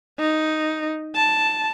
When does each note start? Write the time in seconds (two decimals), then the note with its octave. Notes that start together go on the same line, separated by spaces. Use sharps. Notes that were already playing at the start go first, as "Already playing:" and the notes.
0.19 D#4
1.16 A5